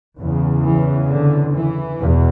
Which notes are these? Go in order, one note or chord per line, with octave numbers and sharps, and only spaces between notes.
E2 C#3
E3
D3
E3
E2 B2